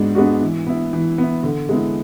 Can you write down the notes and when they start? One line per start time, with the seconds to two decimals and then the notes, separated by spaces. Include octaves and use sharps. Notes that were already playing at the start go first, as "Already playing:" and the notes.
Already playing: G#2 G#3 B3 D4 F#4
0.15 G#3 B3 D4 F#4
0.41 E3
0.67 B3 E4
0.93 E3
1.18 B3 E4
1.43 D3
1.69 G#3 B3 E4